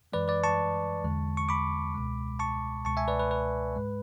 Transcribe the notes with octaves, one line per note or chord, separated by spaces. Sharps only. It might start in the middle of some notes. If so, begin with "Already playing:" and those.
F#2 E3 G#3 B4 D5
B4 D5
A5 C#6
E2 D3 G#3
C#6
B5 D6
C#2 B2 G#3
A5 C#6
C#2 B2 G#3 A5 C#6
E5 G#5
B4 D5
B4
B4
G#2 G#3